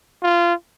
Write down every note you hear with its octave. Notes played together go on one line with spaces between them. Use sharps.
F4